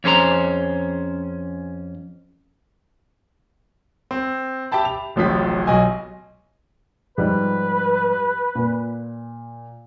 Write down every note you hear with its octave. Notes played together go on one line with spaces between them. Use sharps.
F2 C#4 G#4 C5 A#5
C4
G4 E5 G5 A5 B5
F7
D1 A1 C3 F3 B6
B1 D#5 G#5
G#2 F3 G3 B4
A#2